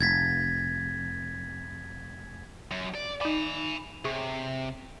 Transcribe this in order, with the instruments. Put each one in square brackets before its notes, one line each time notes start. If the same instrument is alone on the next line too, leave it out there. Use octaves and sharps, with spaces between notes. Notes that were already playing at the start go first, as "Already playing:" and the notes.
[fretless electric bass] F1 [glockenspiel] G#6 A6 B6
[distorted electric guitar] F#2
D5
[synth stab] D#4 D5 [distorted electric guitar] G#5 B5
[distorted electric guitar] C3 [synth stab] G#4 C#5